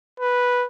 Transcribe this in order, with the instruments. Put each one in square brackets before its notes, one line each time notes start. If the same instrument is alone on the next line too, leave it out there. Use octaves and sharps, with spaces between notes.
[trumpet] B4